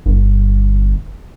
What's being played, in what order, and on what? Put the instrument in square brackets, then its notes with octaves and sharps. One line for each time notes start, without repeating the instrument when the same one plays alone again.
[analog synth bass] G1